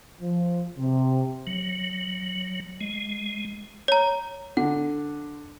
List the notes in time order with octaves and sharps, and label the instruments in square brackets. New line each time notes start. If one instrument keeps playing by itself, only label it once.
[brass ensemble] F3
C3
[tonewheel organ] F#3
G#3
[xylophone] C#5 A#5
[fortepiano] D3 [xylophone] F#5